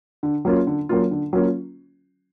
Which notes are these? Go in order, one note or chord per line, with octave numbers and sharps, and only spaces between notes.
D3
F#3 A#3 C#4 F4
D3
F#3 A#3 C#4 F4
D3
F#3 A#3 C#4 F4